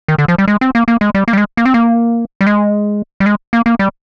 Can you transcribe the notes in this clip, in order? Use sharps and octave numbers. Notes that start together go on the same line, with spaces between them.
D#3
D3
F3
G3
G#3
C4
A#3
A#3
G#3
G3
A#3
G3
G#3
A#3
C4
A#3
G3
G#3
G3
G#3
A#3
A#3
G3